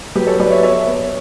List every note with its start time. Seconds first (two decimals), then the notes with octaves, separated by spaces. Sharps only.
0.15 F#3 G4 B4
0.27 A4 C#5
0.39 F#3 B4 D5
0.51 C#5 E5
0.63 B3 C#5 E5
0.87 B3